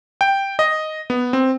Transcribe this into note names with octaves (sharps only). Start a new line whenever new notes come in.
G5
D#5
B3
C4